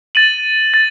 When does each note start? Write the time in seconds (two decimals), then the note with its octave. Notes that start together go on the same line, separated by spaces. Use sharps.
0.15 A6 D#7 F#7
0.74 A6